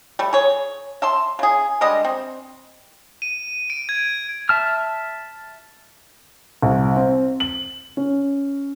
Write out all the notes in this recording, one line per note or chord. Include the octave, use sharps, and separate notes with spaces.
G3 A3
G#4 C#5
E5 A5 C6
C#3 G#4
D3 G3 G#3 D#5
C4
D#7
D7
G#6
E5 A5 F6
C2
C4
F#7
C#4